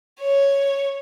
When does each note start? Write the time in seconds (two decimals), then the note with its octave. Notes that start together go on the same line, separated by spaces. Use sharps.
0.20 C#5